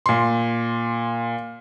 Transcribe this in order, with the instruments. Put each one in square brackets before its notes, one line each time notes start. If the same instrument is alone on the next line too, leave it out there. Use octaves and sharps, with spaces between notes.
[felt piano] A#2 C6